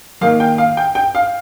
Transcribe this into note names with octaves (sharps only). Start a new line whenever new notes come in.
D#3 A#3 F5
G5
F5
G5
G5
F5